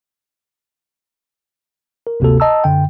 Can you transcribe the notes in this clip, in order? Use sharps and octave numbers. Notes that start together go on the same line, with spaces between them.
A#4
G1 D2 C3 A#3 F#4 A4
D#5 A5 A#5 E6
F#2 D3 G5